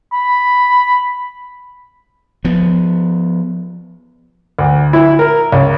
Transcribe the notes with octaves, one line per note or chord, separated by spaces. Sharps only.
B5
F3 B3
D2
E4
A#4
C#2